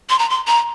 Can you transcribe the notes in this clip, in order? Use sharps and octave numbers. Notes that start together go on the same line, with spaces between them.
C6
A#5
C6
A#5